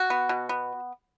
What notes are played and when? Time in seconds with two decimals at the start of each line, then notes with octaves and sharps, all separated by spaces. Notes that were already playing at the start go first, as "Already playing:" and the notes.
Already playing: F#4
0.10 B3
0.29 B2
0.49 B3